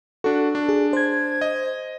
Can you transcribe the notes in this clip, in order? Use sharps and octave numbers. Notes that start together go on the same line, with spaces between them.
D4 F#4 A4
D4
G#4
C5 G#6
D#5